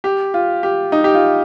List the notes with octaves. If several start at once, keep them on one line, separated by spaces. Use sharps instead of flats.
G4
F4
G4
D#4
G4
F4